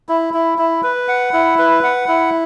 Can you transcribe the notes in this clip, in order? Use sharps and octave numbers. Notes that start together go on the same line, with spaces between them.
E4
E4
E4
B4
F#5
E4
B4
F#5
E4